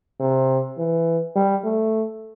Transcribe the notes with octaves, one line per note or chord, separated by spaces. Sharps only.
C3
E3
G3
A3